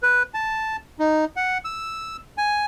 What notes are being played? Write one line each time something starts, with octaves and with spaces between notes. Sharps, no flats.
B4
A5
D#4
F#5
E6
G#5